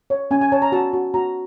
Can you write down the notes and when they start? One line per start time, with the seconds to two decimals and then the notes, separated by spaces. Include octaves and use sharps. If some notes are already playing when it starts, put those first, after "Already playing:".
0.10 C#5
0.31 C#4 G#5
0.41 G#5
0.52 C#5 A5
0.62 A#5
0.72 F#4 A5
0.93 F#4
1.14 F#4 A#5